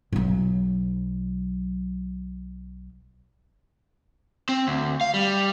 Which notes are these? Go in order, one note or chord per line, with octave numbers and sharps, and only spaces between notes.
B1 F#3
C4
D2
F5
G3